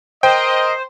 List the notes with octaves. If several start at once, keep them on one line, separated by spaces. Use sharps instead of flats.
A#4 C5 D#5 G5